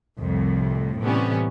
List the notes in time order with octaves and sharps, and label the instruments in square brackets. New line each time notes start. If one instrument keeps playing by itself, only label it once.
[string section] C2 F2 A2
A2 C3 E3 G3 B3 C#4